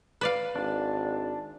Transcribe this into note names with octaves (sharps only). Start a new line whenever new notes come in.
B4 D5 F5
G#1 D4